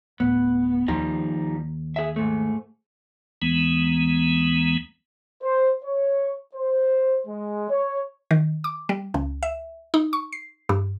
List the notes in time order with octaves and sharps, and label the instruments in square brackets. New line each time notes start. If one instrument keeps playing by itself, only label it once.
[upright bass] D1 [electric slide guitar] B3
[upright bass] D#2 [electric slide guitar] F3 G3 D#4
[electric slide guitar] G#4 E5
G#2 A3
[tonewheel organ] D#2 E3 G#3 B3
[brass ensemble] C5
C#5
C5
G#3
C#5
[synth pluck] D#3
D6
G3
C#2
E5
D#4
C#6
C7
G2